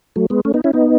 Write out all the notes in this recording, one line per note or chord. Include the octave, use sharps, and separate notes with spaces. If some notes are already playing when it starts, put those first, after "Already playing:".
F#3 A3
G#3 B3
A3 C#4
B3 D#4
C#4 E4
B3 D#4